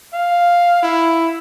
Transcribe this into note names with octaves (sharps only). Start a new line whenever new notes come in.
F5
E4